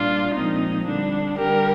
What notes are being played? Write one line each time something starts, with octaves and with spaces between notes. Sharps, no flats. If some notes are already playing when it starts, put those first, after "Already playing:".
Already playing: A#2 G3 D4 F4
A#2 F3 G#3 C4 D#4
D3 G3 D4
D3 G3 G4 A#4